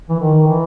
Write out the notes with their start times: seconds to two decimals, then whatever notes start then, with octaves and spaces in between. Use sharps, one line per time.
0.09 E3
0.20 D#3
0.47 E3